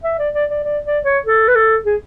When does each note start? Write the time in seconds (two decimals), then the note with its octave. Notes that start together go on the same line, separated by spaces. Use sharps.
0.04 E5
0.19 D5
0.34 D5
0.50 D5
0.64 D5
0.85 D5
1.05 C#5
1.26 A4
1.48 B4
1.56 A4
1.86 G#4